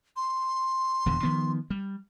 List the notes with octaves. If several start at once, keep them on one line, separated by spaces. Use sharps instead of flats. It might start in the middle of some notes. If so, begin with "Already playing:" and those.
C6
D#1 E2 D3
D#3 F3 B3
G3